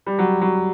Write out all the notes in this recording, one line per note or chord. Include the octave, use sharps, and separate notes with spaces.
G3
F#3
F#3